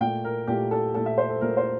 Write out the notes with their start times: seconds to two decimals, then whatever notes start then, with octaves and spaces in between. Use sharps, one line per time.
0.01 A#2 A3 G5
0.24 A#4
0.48 A#2 A3 G4
0.71 A4
0.94 A#2 A3 A4
1.06 E5
1.18 C5
1.29 A4
1.41 A#2 A3 A#4
1.57 C5